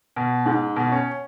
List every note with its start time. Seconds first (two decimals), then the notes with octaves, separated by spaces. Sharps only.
0.16 B2
0.46 G#2
0.76 B2
0.92 C#4